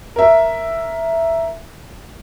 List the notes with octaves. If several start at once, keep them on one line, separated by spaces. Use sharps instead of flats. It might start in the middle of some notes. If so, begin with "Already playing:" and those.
A#4 E5